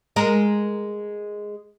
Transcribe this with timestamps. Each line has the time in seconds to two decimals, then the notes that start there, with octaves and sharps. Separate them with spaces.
0.16 G#3 A#4